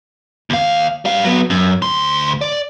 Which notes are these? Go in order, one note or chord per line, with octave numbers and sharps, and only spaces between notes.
D#2 F5
G3 F5
F#3 B3
F#2
D2 C6
D5